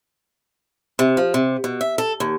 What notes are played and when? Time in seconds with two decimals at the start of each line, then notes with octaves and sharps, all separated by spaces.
0.99 C3
1.17 F3
1.34 C3
1.64 B2
1.81 E5
1.98 A4
2.20 D#2